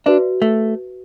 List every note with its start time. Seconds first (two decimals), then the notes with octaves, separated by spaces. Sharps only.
0.06 D4 F#4 B4 E5
0.42 A3